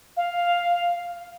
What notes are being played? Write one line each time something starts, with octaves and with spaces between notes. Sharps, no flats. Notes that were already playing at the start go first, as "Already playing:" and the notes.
F5